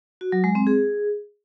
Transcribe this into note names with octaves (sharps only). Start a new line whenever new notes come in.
F#4
F#3
G#3
C4
G#4